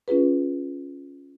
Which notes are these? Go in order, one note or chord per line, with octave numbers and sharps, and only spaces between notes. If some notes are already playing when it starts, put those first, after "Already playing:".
C#4 F4 G#4 B4